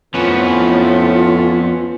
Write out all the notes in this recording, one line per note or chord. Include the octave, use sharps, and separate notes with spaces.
F2 A2 F3 B3 C#4 F4 B4